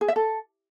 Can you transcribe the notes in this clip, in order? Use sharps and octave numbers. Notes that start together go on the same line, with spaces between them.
G#4
E5
A4